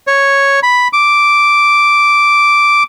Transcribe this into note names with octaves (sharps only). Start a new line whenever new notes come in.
C#5
B5
D6